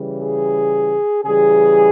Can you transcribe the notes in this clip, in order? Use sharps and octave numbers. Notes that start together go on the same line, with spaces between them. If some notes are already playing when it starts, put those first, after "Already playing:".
Already playing: C#3 E3 G3
G#4
C#3 E3 G3 G#4